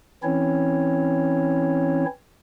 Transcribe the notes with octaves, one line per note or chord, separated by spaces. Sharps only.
E3 C4 C#4 E4 C#5